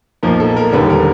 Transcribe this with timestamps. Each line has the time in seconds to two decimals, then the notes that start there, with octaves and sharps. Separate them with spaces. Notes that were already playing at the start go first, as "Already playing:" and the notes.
0.23 B1 A#2 F3 A#3 A#4
0.40 A4
0.57 A#4
0.72 E1 D#2 D3 G3 B4
0.90 A#4